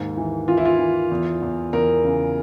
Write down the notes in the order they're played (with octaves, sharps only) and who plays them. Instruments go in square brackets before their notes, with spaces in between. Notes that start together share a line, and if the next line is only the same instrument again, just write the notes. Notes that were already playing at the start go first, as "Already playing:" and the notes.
Already playing: [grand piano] D#2 G#2
E3
E3 F4
E4
F4
E3
E2
E2
E2 A#4
C#3